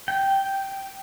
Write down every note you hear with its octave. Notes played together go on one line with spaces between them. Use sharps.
G5